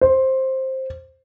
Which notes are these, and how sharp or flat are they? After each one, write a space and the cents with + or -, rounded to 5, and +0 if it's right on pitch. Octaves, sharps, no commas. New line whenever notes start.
C5 +10